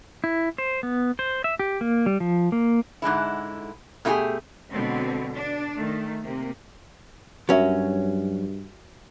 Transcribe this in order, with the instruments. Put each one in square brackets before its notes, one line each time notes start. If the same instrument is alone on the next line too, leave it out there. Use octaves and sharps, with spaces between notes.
[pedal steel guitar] E4
C5
B3
C5
E5
G4
A#3
G3
F3
A#3
[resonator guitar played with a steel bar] G#2 D3 G#3 E4
B2 A3 D#4 F4 G4 G#4
[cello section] B2 D3 F#3 G#3 C4
D4
D#3 A3
C3 A#3
[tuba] G2 [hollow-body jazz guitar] F#3 C#4 [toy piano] F#4 A#4 E5